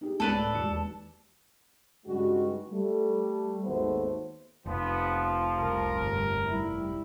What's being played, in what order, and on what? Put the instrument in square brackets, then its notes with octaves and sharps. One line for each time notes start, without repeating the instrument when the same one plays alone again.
[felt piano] D#4 G4 G#4
[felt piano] C#2 [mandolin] A4 B4 D5
[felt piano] A2
E1 D#2 C#7
[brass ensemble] G2 C#3 G3 G#3 D#4 F#4
G3 A3
G#1 D#2 A3 B3 C5
[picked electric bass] F1 [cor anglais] F3 [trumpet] B3
[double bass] C2 [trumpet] A#4
[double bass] G1
G3 E4